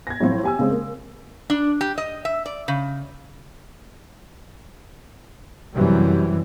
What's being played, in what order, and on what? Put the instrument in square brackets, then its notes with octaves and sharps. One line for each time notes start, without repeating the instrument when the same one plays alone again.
[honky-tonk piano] G#6 A#6
A2 F3 F#3 C4
G4 G#5 E6
C#3 G#3 C4
A#3
[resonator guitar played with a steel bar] D4
G4
D#5
E5
D5
C#3
[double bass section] F#2 C3 E3 G3